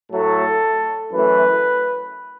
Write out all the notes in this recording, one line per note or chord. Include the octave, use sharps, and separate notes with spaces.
A2 F#3 A3 A4
F#2 E3 A3 B4